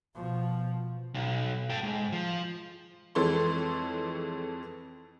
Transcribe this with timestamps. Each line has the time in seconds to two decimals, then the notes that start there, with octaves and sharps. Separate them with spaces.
0.16 B2 F3
1.14 B1
1.70 A4 G5
1.83 G#2
2.12 F3
3.15 F2 E3 G#3 A4 C#5 C6